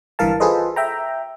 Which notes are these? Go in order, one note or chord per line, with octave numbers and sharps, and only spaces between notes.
G1 G2 E3 A#4 F5 A5
F4 G#4 A4 B4 C5 D#5
E5 G5 A#5